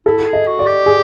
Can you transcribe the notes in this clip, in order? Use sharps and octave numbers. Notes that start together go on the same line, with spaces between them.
E4 A4
G#4
D#5
F#4
D5
G4
G#4